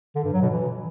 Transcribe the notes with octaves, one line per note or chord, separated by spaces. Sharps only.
D3
G2
F#3
B2
E3